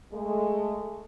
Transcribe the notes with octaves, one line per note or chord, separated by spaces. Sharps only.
G#3 A3